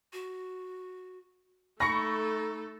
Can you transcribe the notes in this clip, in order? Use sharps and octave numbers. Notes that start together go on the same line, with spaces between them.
F#4
A3 D#4 A4 B5 C#6 A#6 C#7